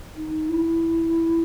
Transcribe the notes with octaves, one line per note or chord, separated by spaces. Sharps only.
D#4
E4